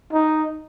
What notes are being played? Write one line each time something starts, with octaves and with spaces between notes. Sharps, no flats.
D#4